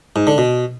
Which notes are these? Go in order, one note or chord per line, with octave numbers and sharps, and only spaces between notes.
G#2
D3
B2